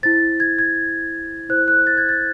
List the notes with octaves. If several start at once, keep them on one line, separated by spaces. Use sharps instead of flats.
E4 C5 A6
G#6
G#6
E4 C5 F#6
F#6
A6
G#6
A6